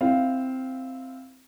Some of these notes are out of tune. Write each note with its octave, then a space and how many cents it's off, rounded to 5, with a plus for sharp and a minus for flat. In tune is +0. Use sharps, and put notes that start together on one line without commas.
C4 -5 E4 +0 F5 +0